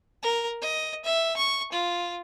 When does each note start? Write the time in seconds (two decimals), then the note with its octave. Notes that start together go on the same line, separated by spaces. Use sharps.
0.23 A#4
0.62 D#5
1.04 E5
1.37 C#6
1.72 F4